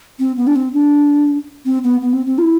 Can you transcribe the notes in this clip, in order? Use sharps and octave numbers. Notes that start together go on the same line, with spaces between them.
C4
B3
D4
C4
D4
C4
B3
B3
C4
C4
F4
E4